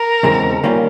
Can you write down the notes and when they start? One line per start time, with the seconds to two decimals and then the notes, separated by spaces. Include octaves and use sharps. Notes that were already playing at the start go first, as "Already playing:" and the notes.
Already playing: A#4
0.23 E2 C#3 E3 G#3 C4
0.63 D#3 G3 A#3 C#4 F4